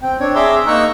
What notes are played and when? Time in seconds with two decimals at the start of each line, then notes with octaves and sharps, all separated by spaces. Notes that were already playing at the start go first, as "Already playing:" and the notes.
0.02 C4 G5
0.20 C4 D4 C#5
0.35 G#4 E5 A#5 C6 D6 E6
0.67 A#3 D#4 A#5 C#6 E6 F#6